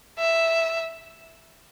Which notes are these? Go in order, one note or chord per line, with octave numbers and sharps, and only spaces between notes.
E5